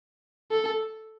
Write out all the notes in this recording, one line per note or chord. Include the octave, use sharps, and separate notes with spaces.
A4